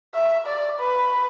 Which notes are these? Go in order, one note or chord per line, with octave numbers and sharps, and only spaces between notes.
E5
D5
B4